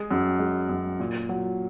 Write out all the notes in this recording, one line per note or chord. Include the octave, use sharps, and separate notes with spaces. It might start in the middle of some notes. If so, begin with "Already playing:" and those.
Already playing: G#3
F#2
G#3
F#2
A#2
F#3